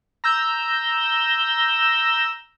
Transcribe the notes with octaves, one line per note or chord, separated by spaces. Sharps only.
A#5 E6 G6